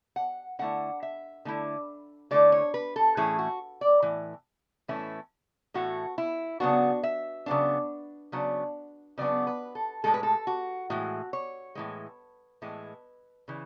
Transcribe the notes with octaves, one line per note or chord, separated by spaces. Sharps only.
F#5
D3 A3 E4 F#5
E5
D3 A3 E4
D3 A3 E4 D5
C#5
B4
A4
A2 E3 A3 C#4 E4 G#4
F#4
D5
A2 E3
A2 E3 A3 C#4 E4
A2 E3 A3 E4 F#4
E4
C#3 F#3 B3 D4 F#4
E5
C#3 F#3 B3 D4
C#3 F#3 B3 D4
C#3 F#3 B3 D4 D5
B4
A4
A2 E3 G#3 A4
B4
A4
F#4
A2 E3 G#3 F#4
C#5
A2 E3 G#3
A2 E3 G#3
C#3 E3